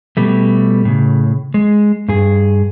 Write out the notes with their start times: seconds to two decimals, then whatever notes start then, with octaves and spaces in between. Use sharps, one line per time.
0.17 B2 G3 A3
0.85 A2 C#3
1.54 G#3
2.08 G2 G#4